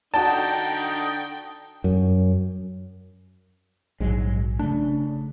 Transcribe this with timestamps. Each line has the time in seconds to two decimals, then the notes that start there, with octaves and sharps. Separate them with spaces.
0.14 D3 D4 D#4 F#4 G5 A5
1.84 F#2
4.01 A#1 G#2 F#3 G#3
4.59 C#3 A3 D4